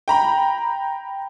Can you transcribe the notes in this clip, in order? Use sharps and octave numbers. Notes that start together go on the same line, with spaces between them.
G5 A#5 B5